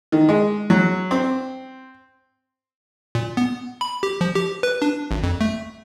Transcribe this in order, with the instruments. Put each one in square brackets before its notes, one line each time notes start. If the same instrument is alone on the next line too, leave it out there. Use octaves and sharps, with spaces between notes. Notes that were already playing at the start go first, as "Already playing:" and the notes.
[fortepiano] D#3
G#3
F#3
C4
[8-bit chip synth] A#2
B3
B5
G4
F3
G4
B4
D4
G#1
F2
A3